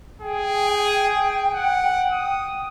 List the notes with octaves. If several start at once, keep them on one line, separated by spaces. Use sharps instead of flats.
G#4 G5
F#5
D#6